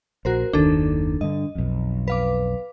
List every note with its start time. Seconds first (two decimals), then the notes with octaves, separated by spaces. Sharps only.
0.25 A#1 F#4 A#4 C5
0.53 F#1 D#2 D#3 D4 A4
1.21 G2 D3 D#5
1.55 B1 F2
2.08 B4 F5 D6